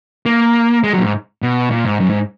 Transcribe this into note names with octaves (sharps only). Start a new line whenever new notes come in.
A#3
G#3
F#3
A#2
G#2
B2
A#2
G#2
F#2
G#2